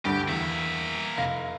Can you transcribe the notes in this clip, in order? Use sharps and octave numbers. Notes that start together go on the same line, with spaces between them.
D2 G2 G4
E2 A#3 E5
F1 F5 A#6